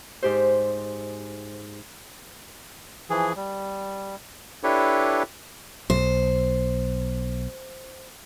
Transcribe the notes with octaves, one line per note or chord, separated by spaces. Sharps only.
G#2 G4 C5
E3 F3 G#4
G3
D4 E4 G4 A4 B4 C#5
B1 C5